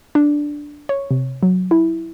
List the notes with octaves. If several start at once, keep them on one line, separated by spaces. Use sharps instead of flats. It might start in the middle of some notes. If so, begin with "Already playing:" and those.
D4
C#5
C3
F#3
E4